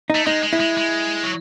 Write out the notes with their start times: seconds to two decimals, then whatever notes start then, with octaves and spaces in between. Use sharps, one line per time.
0.10 D#4
0.15 A3
0.26 G#3 D#4
0.43 G#3
0.53 E4
0.60 G#3
0.78 G#3
1.23 F#3